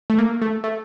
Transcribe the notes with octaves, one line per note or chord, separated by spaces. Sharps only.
A3
A#3
A3
A3